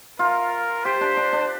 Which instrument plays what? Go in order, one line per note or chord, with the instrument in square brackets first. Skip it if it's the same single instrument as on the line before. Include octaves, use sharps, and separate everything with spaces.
[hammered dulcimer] F4 [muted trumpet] A#4
[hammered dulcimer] G4 [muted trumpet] C5
[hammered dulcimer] D4
D4
D4